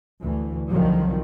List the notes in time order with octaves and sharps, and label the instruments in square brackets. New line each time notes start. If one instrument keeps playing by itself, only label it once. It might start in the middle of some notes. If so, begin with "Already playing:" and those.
[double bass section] D2 E3
C2 F2 D3 D#3 F3 F#3